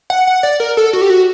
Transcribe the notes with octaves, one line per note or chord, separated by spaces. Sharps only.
F#5
F#5
D5
A#4
A4
F#4
G4
F#4